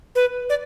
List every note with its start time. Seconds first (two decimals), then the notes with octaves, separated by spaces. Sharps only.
0.15 B4
0.49 D5